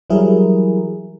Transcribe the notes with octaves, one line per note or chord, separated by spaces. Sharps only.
E3 F#3 G3 E4 G#4 A#4